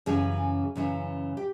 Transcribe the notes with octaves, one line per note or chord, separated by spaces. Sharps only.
F#2 C#3 E3 G#4
F#2 C#3 E3
G4